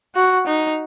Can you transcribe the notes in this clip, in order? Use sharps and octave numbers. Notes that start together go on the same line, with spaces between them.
F#4
D#4